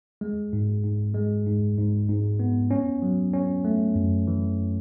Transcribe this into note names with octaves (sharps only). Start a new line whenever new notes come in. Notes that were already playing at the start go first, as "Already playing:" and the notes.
G#3
G#2
G#2
G#3
G#2
G#2
G#2
B3
C#4
F#3
C#4
A3
F#2
E3